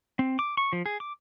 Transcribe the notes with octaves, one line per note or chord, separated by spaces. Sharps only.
C4
D6
C#6
F3
G#4
D6